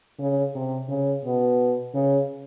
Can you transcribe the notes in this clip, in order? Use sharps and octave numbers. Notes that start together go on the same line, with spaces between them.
C#3
C3
C#3
B2
C#3